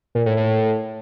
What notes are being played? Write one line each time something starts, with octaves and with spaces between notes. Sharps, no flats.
A#2
A2
A2